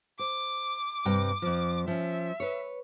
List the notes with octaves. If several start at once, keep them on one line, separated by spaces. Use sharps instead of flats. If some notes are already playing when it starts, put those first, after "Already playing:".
C5 D6
G2 C3 G5
F2 F3
F3 C#4 E5
B4 C#5